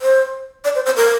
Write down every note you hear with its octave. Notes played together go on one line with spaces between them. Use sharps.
C5
D5
C5
C5
A#4